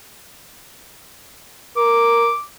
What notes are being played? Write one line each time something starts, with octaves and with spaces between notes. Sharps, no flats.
A#4 D6